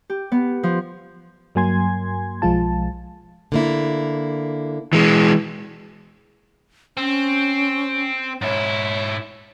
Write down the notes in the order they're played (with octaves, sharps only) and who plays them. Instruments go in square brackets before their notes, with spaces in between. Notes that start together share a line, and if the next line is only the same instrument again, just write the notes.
[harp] G4
B3
F3
[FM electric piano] G2 F#3 A#3 G#5 C6 G#6
B1 F3 G#3 F4 A5
[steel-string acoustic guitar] D3 A#3 E4
[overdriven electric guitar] E3 G#3
[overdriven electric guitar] C4 [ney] C#4
[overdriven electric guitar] G#2 E4 [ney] C#5